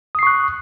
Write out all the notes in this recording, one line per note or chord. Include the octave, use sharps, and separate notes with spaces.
C#6 D#6 F#6 C7